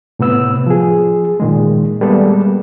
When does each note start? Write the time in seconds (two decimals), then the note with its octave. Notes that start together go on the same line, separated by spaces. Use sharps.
0.19 A2 C3 B3 E6
0.66 F3 G#4
1.40 A#2 D#3 G#3
2.01 G3 G#3 A#3 B3 A4